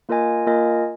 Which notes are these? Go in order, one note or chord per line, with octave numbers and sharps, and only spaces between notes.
A#3 F4 A#4 D#5 G#5
A#3 F4 A#4 D#5 G#5